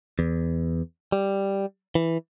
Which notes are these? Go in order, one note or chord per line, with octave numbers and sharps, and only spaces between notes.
E2
G3
E3